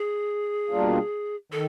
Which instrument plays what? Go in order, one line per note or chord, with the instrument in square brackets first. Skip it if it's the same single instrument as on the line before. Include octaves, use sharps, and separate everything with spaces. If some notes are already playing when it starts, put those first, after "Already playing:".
Already playing: [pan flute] G#4
[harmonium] B2 G3 A#3 D4 F4
[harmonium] D#3 [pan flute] A4